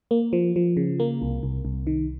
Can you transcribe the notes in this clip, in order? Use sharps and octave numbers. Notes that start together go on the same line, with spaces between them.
A#3
F3
F3
C#3
A#3
C2
C2
C2
D#3